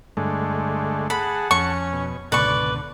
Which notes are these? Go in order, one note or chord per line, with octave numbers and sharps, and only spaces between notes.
G2 D3 G#3 A3
G#4 F#5 A5 B5
F2 C#4 C#6
B2
G#1 C#2 B2 D3 B4 D5 C#6